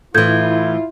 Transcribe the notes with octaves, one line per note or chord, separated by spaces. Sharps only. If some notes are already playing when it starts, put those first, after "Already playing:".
A2 E3 E4 F4 A4 G6 G#6